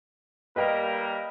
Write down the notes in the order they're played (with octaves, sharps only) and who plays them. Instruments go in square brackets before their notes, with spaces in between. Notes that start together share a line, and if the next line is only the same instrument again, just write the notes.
[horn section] G3 A#3 A#4 [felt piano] B4 D#5 G5